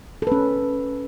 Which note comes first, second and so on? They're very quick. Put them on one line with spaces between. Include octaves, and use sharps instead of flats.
A4 B4 C#4